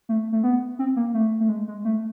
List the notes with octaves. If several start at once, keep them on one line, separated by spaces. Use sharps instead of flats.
A3
A3
B3
C4
A#3
A3
A3
G#3
G#3
A3